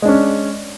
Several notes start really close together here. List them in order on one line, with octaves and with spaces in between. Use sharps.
G#3 D4 C#4